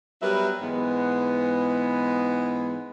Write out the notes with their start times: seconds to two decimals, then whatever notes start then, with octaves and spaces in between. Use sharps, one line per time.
0.22 F#3 G3 B3 A#4 B4 E5
0.62 G#2 E3 G#3 B3